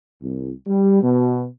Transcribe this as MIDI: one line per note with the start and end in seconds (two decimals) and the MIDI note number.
0.21 0.52 36
0.67 1.01 55
1.02 1.45 47